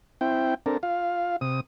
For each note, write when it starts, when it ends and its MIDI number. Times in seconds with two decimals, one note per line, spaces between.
0.21 0.54 60
0.21 0.54 64
0.21 0.54 79
0.66 0.78 60
0.66 0.78 62
0.66 0.78 69
0.66 0.78 70
0.83 1.36 65
0.83 1.36 77
1.41 1.60 48
1.41 1.60 87